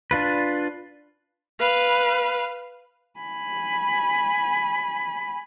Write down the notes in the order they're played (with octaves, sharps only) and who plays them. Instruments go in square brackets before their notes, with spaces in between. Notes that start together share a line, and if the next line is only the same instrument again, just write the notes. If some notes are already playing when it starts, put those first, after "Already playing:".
[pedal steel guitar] D4 F4 B4
[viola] B4 F5
[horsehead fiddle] G#5 B5